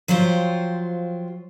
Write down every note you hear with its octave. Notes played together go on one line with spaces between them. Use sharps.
F3 F#3 F4 C5 G5